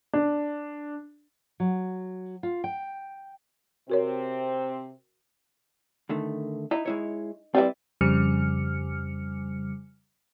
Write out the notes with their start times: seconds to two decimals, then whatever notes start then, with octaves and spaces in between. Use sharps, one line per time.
0.13 D4
1.60 F#3
2.43 F4
2.64 G5
3.90 C3 C4 F#4 A#4 C#5
6.09 D3 D#3 A3
6.71 D#4 E4
6.86 G#3 E4 C#5
7.55 G3 C4 E4 B4 D5
8.01 F2 C#3 G3 F6 C#7